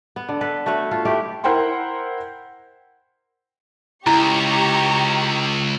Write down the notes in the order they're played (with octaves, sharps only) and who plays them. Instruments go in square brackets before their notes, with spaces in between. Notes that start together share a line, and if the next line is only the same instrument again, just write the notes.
[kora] B3
D3
A4 B4
A3 F#4 B4 C#5
F4 A4
A3 E4 G4 B4
[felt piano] E4 A#4 C5 F#5 G5 C6
[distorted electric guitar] C#2 [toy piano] E4 [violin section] G4 A#5 C#6